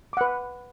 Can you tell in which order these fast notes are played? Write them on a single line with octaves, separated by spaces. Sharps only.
D6 F#5 B4